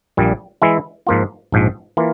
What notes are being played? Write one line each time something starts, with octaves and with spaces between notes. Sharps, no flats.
A#1 A#2 G3
E3 G#3 E4
G#2 F3 A#3 F4
A#1 G#2 F3
E3 A#3 F4